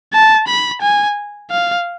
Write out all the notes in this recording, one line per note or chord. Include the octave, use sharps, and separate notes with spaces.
A5
B5
G#5
F5